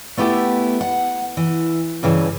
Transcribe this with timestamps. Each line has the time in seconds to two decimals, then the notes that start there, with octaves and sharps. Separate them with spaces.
0.17 A3 B3 E4 G4 A4
0.81 F#5
1.37 E3
2.03 G2 C#3 E3